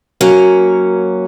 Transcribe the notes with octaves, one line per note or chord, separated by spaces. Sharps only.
F#3 A#3 C#4